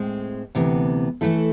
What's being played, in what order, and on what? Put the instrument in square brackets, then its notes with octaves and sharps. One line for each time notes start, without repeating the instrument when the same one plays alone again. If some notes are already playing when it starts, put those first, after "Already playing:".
Already playing: [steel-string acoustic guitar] A2 G#3 C4
D2 C3 E3 B3
E3 A3 E4 A4